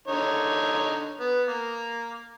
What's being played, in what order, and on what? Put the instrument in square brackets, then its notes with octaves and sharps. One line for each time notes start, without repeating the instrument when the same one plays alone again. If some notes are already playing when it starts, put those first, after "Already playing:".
[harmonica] D3 D#4 C#5
B3
A#3